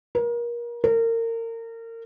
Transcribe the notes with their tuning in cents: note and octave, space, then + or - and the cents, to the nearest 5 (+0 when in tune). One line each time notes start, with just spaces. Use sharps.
A#4 +30
A#4 -30